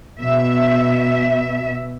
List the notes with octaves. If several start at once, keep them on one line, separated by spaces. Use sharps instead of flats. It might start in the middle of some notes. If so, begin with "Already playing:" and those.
B2 E5